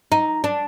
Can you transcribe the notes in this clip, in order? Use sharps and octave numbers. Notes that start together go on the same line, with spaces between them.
D#4
D4